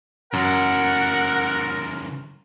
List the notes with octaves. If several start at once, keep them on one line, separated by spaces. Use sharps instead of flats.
F#2 C#3 E3 A#4 F#5